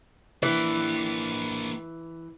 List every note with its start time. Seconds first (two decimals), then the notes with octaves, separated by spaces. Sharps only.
0.43 E3 A#3 D4